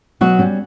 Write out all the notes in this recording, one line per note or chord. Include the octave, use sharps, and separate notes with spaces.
B2 F#3 F#4
G3 C#4